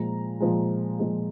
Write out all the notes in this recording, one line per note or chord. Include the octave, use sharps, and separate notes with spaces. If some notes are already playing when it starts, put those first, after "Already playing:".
Already playing: A#2 F3 G#3 A#5
A#2 F3 G#3
A#2 F3 G#3